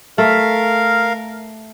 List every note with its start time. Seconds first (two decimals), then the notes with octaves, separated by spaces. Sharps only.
0.18 A3 A#4 F5